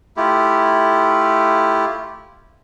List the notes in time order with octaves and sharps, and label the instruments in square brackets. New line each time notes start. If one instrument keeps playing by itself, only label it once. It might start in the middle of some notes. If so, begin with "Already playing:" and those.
[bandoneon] A3 E4 F4 G4